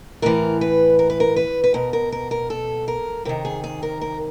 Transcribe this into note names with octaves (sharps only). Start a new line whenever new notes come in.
A2 E3 A#4
B4
A#4
B4
A#4
B4
B4
B2 A#4
A#4
A#4
A#4
A4
A#4
C3 D#3 A#4
G#4
G#4
A#4
A#4